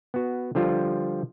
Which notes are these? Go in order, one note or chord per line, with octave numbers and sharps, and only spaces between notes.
B3 F#4
D3 F3 G3 F4